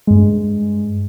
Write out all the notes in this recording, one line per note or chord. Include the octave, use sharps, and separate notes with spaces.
G2 G#3